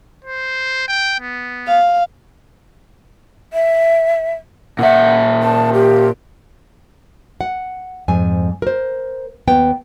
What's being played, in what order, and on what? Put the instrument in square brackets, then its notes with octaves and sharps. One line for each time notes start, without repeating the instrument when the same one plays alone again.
[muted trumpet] C5
G5
B3
[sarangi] F5
[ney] E5
[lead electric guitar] A#2 E5 [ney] F#5
[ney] A5
G4
[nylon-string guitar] F#5
F2 G#2 G#5
A#4 C5
D#2 B3 G5